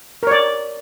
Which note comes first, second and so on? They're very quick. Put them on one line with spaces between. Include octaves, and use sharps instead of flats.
A#4 C#5 D5